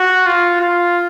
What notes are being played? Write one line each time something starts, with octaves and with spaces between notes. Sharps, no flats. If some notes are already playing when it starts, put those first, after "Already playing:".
Already playing: F#4
F4
F4